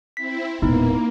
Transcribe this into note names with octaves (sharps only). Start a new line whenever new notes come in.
C4 E4 B6
E1 A#2 A#3 B3 D#4 E4